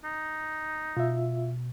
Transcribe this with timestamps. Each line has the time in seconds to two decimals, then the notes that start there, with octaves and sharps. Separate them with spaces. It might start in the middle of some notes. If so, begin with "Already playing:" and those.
0.04 D#4
0.97 B2 F4 E5